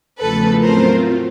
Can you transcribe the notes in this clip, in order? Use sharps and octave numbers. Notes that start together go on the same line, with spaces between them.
E2 C#3 F3 A3 A4 B4
A2 F#3 A3 C4 F4 A#4 C5